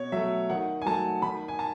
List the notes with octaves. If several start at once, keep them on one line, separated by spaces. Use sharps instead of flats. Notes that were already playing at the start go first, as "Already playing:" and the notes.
Already playing: B2 C#5
F#3 A3 E5
D#3 F#5
G#5
F#3 A3 A5
D#3 B5
G#5
A5